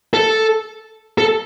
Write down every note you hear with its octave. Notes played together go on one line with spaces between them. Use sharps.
A4
A4